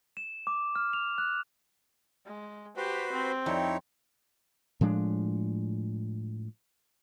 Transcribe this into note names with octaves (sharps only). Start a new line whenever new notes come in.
E7
D6
F6
F7
F#6
G#3
F#4 G4 B4 C5
C4
F2 D#4 E4 C#5
A2 F3 G#3 D4